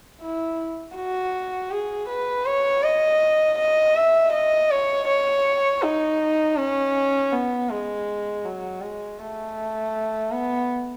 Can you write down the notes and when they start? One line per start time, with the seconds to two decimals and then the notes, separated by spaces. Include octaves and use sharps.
0.21 E4
0.96 F#4
1.71 G#4
2.09 B4
2.46 C#5
2.84 D#5
3.58 D#5
3.96 E5
4.33 D#5
4.71 C#5
5.08 C#5
5.83 D#4
6.58 C#4
7.32 B3
7.70 G#3
8.45 F#3
8.82 G#3
9.19 A3
10.31 B3